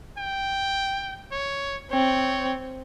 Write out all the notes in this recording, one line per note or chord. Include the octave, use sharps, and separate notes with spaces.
G5
C#5
C4 C#5